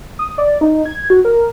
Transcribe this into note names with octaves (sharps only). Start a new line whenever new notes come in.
D#6
D5
D#4
G#6
F#4
A#4